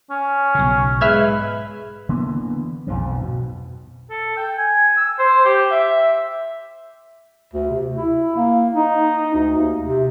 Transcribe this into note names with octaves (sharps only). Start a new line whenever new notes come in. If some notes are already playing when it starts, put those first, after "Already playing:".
C#4
B1 C#3
G#2 G#3 B4 E5 F6 G#6
D3 E3 A#3 B3
B1 F2 G#2 F3
B2
A4
G5
G#5
E6
C5
G4
E5
D2
C3
E4
A#3
D#4
D2
D#2
C3